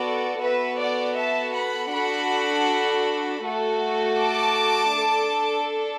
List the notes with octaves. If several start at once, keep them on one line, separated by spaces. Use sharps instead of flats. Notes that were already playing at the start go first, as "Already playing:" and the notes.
Already playing: B3 F#4 A4 D5
B3 F#4 A4 B4 E5
D5 F#5
E5 A5
F#5 B5
D4 F#4 A4 F#5 B5
A3 F#4 A4
A5 D6
D4 A4